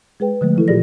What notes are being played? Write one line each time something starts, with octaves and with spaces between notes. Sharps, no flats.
G#3 G#4 B4 G5
D3 F3 G#3 A3
E3 E4 A4
A#2 F4 G4 G#4 D5 A#6